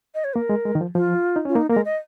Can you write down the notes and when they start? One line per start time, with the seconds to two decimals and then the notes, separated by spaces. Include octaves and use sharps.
0.15 D#5
0.24 C#5
0.35 A#3 A#4
0.49 G#3
0.65 G#3
0.75 D#3
0.81 F3
0.95 F3 F4
1.36 D#4
1.45 C#4 F4
1.55 A#3 D#4
1.69 A#3 A#4
1.76 G#3
1.85 D#5